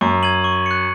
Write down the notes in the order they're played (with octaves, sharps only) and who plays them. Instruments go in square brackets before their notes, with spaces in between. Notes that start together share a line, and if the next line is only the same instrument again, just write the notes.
[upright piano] F#2 [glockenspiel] C#6
[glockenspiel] G#6 D#7 F#7
C#6
F#6 C#7